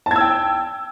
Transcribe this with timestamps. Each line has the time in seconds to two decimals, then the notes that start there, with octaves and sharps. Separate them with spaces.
0.06 A5
0.11 G#6
0.16 E6
0.21 G5